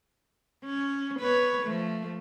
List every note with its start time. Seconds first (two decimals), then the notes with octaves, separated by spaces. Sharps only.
0.66 C#4
1.19 B3 B4 C#5
1.62 F3 A3